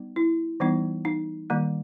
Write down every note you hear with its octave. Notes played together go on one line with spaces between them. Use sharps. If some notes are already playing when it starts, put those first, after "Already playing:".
Already playing: G3 B3 D#4
E4
E3 G3 B3 D#4
D#4
D#3 G3 A#3